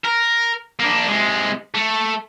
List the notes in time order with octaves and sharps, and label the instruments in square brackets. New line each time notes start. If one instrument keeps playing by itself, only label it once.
[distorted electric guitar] A#4
A#3 D4
C3 G#3
A3